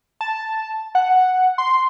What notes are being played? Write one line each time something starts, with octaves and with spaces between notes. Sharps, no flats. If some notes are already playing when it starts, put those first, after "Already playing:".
A5
F#5
C6